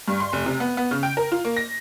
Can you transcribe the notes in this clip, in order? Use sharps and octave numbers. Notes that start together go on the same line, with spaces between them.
G2
C6
F1
C3
B3
B3
C#3
G5
A#4
F4
A#3
A#6